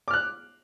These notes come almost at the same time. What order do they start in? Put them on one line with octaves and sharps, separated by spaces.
D6 F6 F#6